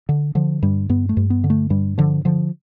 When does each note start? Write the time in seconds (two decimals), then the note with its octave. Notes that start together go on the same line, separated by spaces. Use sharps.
0.09 D3
0.35 D3 F3
0.62 G2 G3
0.89 G2 B3
1.09 A3
1.17 G2
1.30 B3
1.44 D3
1.50 A3
1.70 G2 G3
1.98 D3 F3
2.25 D3 F3